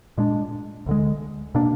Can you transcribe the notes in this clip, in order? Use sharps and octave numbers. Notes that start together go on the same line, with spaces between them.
A#2 G#3 D4
D2 D3 G#3
B2 A#3 D4